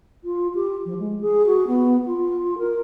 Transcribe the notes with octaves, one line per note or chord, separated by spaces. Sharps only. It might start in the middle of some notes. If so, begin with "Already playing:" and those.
F4
G4
F3
G#3
G#4
F#4
B3
F4
A#4